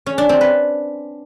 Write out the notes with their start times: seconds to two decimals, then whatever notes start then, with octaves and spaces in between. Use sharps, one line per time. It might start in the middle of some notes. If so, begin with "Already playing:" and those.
0.06 C#4
0.18 D4
0.29 C4
0.41 B4